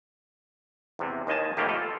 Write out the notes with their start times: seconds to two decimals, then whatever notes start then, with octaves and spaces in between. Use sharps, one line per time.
0.99 E2 C3
1.27 D#2 D#3 D#5 G#5 A5
1.57 G#2 B2 D#3 A3 A#3 G4
1.69 F4 A4